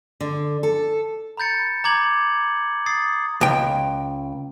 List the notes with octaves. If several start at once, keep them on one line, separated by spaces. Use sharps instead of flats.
D3
A4
A#5 B5 G6 A6 C#7
A#5 D6 G#6 F#7
D#6 A6 C7
C#2 G5